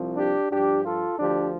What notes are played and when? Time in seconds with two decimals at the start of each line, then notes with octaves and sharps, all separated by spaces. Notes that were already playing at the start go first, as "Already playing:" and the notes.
Already playing: C2 C3 F3
0.16 D4 G4
0.51 G2 F3 D4 G4
0.84 F4 A4
1.18 D2 D3 F3 D4 G4